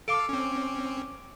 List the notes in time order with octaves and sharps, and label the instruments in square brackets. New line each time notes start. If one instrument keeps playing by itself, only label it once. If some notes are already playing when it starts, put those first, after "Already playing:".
[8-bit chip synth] A4 F5 [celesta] D6 D7
[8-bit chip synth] C4 C#4